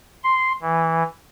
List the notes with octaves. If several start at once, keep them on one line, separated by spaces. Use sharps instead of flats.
C6
E3